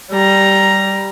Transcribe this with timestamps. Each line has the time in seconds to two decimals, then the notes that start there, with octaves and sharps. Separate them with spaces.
0.12 G3 A#5